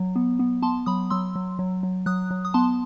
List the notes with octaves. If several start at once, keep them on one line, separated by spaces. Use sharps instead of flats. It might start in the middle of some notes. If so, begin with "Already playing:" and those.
Already playing: F#3
B3
B3
B3 A5 C6
F#3 B5 D#6
F#3 C6 E6
F#3
F#3
F#3
F#3 D#6 F#6
F#3
D#6
B3 A5 C6